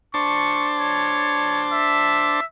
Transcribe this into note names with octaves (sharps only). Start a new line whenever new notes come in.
D4 C5 A5 C#6
C#5
E5